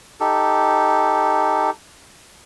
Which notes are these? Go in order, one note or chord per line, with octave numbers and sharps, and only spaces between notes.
D#4 G4 A4